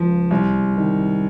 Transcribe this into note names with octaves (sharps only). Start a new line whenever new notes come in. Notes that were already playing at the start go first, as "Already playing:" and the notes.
Already playing: C#2 F3
C2
D#3